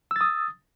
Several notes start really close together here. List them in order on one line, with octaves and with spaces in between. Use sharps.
E6 A6 D#6